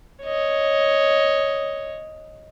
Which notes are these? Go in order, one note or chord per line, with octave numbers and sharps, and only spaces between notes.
C#5 D#5